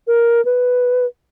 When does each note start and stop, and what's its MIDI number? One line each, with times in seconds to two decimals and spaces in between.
0.07 0.44 70
0.45 1.06 71